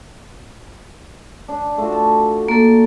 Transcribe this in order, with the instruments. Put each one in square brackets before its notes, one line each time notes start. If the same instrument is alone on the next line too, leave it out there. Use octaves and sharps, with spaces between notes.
[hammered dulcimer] D4
A3 F4 F#4
A5
[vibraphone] A#3 A4